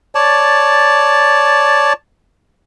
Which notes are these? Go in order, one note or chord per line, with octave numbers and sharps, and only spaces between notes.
C#5 D5 A5